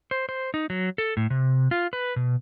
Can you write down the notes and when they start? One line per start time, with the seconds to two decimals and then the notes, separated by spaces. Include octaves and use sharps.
0.11 C5
0.29 C5
0.54 D#4
0.70 F#3
0.98 A4
1.17 A2
1.30 C3
1.71 F4
1.93 B4
2.16 B2